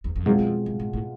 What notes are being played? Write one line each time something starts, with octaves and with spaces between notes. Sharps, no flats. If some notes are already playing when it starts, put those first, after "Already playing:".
E2
F2
F#2 B2 G#3 C4 F4
F#2
F2
G2
G#2
A2